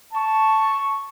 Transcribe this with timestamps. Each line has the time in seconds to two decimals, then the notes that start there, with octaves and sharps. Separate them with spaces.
0.14 A5 C#6